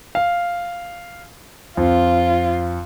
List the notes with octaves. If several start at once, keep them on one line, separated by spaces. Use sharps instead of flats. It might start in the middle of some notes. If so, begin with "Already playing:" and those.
F5
F2 F4